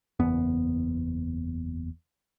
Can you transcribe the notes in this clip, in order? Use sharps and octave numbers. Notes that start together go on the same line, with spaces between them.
F#1 E2 B3